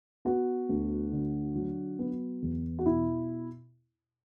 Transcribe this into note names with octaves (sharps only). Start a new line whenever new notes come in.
B3 F#4
D2
D3
F#3
B3
E2
F#4
B2 E4